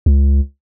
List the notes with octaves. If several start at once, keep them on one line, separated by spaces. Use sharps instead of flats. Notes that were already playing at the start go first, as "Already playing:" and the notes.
C#2